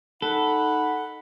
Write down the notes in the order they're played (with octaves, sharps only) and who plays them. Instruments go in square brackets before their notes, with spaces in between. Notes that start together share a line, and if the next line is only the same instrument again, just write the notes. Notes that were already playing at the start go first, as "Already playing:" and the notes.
[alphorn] D#4 [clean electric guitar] A4 [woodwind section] F#5 [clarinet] B5